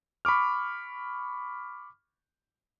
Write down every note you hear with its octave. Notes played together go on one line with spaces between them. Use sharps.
B5 C#6 D6 F6